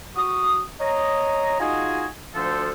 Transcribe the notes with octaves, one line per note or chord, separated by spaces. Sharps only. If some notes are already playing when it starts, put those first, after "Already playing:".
F#4 D#6
C#5 D#5 A#5
D#4 F4 F#4 G#4 D#5 G#5
D2 F3 A4 C5